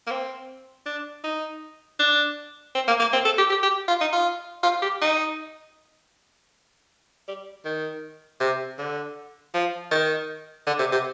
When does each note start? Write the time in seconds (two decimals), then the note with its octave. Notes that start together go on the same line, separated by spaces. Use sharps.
0.07 A#3
0.11 C4
0.86 D4
1.24 D#4
1.99 D4
2.75 C4
2.88 A#3
3.00 A#3
3.13 C4
3.25 A4
3.38 G4
3.50 G4
3.63 G4
3.88 F4
4.01 D#4
4.12 F4
4.63 F4
4.82 G4
5.01 D#4
7.28 G3
7.65 D#3
8.40 C3
8.78 D3
9.54 F3
9.91 D#3
10.67 D3
10.79 C3
10.92 C3